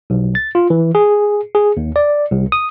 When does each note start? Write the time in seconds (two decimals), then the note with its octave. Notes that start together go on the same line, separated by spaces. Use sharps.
0.10 B1
0.35 A6
0.55 F4
0.70 E3
0.95 G#4
1.55 G#4
1.77 D#2
1.96 D5
2.31 C2
2.52 D#6